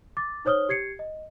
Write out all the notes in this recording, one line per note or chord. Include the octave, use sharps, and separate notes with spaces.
D6 A6
D#4 C5 C#5 D#6 F6 G7
G4 G#6 C7 C#7
D#5